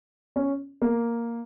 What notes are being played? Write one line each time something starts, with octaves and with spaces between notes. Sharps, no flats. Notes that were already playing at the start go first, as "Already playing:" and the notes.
C#4
A#3